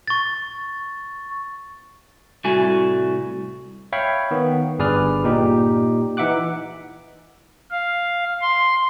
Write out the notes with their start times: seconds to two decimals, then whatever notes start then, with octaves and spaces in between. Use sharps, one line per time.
0.07 C#6 A6
2.44 C2 A2 A3 F#4 G#5
3.93 C#5 E5 F5 G5 B5 C#6
4.31 D#3 B3
4.79 G1 G2 G#4 B4 D5 F6
5.24 A#2 D#4 G4
6.17 E3 D#4 E5 F#5 D6 F#6
7.71 F5
8.41 C6